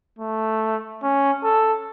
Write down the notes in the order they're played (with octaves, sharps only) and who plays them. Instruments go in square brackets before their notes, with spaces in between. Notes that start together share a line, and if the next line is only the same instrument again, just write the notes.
[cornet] A3
C#4
A4